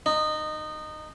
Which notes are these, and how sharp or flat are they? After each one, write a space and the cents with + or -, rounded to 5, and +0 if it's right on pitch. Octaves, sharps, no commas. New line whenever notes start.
D#4 -20